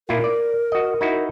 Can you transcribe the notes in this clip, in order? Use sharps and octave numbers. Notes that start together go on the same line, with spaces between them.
A#2 E4 F4 A#4
D5
F#4 D#5
D#4 E4 F#4